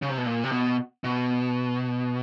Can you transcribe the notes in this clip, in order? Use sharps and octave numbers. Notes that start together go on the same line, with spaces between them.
C#3
C3
B2
A#2
C3
B2
B2